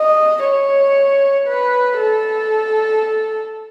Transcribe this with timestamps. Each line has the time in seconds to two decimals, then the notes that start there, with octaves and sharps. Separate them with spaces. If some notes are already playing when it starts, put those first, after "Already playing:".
Already playing: D#5
0.44 C#5
1.48 B4
1.99 A4